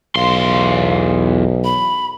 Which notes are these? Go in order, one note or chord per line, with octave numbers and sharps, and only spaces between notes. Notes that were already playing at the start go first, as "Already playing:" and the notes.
B1 E2 F5 C6
B5